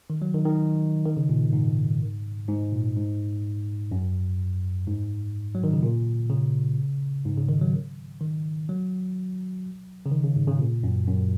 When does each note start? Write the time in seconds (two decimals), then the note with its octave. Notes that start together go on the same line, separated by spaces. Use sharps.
0.10 D#3
0.22 F#3
0.34 D#3
0.45 D#3
1.05 D#3
1.17 C#3
1.29 A#2
1.53 G#2
2.48 G#2
2.72 A#2
2.96 G#2
3.91 F#2
4.87 G#2
5.55 F#3
5.64 D#3
5.73 C#3
5.82 A#2
6.30 C#3
7.26 G#2
7.38 C#3
7.49 D#3
7.61 F#3
8.21 D#3
8.69 F#3
10.06 C#3
10.11 D#3
10.24 C#3
10.36 G#2
10.47 C#3
10.59 A#2
10.83 F#2
11.08 F#2